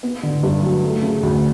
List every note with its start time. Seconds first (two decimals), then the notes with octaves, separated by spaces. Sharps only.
0.03 B3
0.23 D3
0.43 G2
0.62 F#3
0.83 A3
1.02 C#3
1.23 D2